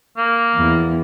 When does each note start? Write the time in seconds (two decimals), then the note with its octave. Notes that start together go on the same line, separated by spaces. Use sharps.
0.17 A#3
0.55 E2